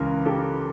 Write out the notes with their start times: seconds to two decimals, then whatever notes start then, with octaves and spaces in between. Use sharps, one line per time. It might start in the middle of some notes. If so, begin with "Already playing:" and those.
Already playing: C#2 C#3 E3 A#4
0.25 G4 A4